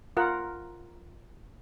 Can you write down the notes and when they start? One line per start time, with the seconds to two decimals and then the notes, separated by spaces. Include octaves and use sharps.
0.17 F4 A#4 F#5